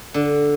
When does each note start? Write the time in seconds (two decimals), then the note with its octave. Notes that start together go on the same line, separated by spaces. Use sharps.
0.14 D3